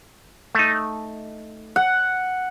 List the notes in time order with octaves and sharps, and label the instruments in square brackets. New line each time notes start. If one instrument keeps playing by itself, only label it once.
[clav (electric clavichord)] A3 D#4
[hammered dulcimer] F#5